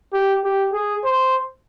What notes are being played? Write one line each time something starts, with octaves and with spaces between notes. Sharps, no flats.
G4
G4
G#4
C5